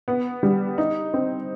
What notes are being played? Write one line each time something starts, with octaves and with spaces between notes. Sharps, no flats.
B3
G3
D#4
C4